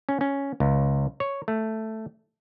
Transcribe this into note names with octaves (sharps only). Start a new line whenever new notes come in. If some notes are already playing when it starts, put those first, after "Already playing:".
C#4
C#4
C#2
C#5
A3